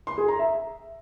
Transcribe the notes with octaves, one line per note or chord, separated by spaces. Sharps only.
C6
G#4
A#5
E5